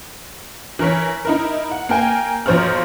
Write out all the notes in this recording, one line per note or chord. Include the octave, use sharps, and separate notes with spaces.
E3 A#4 C#5 B6
D#4 E4 A#4
F#5
A#3 A#4 G5 G#5
B1 F3 C5 C#5 A#5 F6